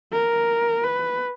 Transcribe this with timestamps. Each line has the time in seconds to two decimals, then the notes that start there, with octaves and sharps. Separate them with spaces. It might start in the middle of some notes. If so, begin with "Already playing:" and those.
0.13 A#4
0.84 B4